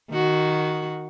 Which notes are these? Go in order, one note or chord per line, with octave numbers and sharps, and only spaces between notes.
D#3 F#4